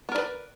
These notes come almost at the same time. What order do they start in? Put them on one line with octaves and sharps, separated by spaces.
B3 A#4 D5 B4